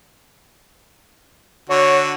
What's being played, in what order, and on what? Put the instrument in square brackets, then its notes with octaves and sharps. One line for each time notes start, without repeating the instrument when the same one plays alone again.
[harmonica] D3 F#4 [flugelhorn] C#5